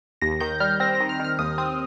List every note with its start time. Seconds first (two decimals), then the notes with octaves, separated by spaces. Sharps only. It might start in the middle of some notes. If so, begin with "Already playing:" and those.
0.22 D#2 A#6
0.41 D#3 G6
0.60 G3 F6
0.80 C4 A#6
0.95 A#6
1.00 D#3
1.09 F6
1.20 D#3
1.25 F6
1.39 D#2 D#6
1.58 C4 D#6